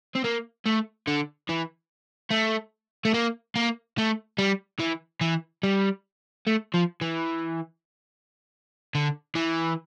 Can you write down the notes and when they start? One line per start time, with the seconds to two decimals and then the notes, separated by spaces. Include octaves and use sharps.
0.15 C4
0.24 A#3
0.66 A3
1.08 D3
1.49 E3
2.31 A3
3.05 A3
3.14 A#3
3.56 A#3
3.98 A3
4.38 G3
4.80 E3
5.21 E3
5.63 G3
6.47 A3
6.74 F3
7.02 E3
8.95 D3
9.36 E3